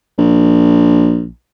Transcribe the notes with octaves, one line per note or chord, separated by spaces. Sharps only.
A#1